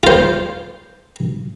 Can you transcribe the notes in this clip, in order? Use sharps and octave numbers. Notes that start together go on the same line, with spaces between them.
F4 C5